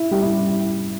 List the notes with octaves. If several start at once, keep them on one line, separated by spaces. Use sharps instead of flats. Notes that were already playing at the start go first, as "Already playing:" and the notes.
Already playing: E4
G3 G4
E4